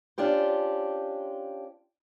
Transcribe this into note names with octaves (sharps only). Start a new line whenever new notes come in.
C#4 D4 F4 G4 C5